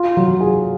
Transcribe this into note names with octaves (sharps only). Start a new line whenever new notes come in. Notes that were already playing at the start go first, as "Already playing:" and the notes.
Already playing: F4
F#3
G#4